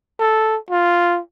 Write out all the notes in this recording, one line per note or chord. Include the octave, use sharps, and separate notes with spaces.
A4
F4